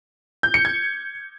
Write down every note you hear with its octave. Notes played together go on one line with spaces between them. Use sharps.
G6
C#7
G#6